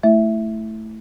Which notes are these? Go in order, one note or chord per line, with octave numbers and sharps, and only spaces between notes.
A3 E4 E5